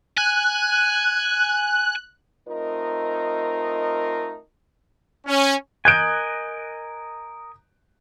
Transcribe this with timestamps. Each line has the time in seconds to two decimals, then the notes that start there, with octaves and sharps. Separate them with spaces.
0.18 G#5 F#6
2.48 A3 C4 D#4 F4 A#4 D#5
5.27 C#4
5.85 A#4 D#5 G#5 F#6 G6 D7